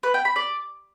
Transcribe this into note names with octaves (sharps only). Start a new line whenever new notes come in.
B4
G5
B5
D5